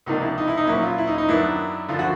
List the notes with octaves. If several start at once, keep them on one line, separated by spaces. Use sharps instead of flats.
C#2 C3 F3 A#3 D4 D#4
E4
D#4
E4
D#4
A#2 F#3 A#3 C#4 E4
F4
E4
D#4
D#4
F#2 D#3 F#3 B3 D4 E4
F#2 D3 F3 F4
F#4